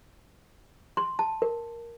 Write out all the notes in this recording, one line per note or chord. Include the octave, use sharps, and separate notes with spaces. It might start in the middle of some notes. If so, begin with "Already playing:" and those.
C6
A5
A#4